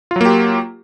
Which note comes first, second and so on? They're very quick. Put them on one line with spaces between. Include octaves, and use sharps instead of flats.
F4 F#3 A#3 G4